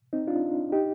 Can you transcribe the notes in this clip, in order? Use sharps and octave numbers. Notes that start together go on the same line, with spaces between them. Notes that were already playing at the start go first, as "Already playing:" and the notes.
C4 D#4
D4 F4
D#4 G4